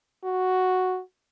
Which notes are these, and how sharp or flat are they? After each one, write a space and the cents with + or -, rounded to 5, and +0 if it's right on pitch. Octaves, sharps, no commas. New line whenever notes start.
F#4 +0